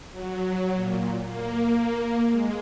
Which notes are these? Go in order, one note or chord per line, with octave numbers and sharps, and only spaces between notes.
F#3
A#2
A#3
G#3